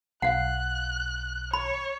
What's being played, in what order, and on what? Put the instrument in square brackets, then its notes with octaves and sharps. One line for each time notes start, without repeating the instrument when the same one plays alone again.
[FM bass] B1 [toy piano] F5 F#5 [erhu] F#6
[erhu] C#5 [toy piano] B5